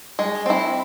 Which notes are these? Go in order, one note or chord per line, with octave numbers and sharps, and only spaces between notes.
G#3
C4 E4